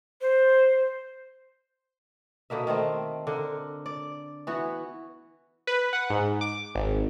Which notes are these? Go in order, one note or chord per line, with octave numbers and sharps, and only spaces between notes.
C5
B2 D3 A#3 E5
D#3 A3 C4
D3 A#4
D5
E3 B3 F#4
B4
F#5
G#2
D6
G#1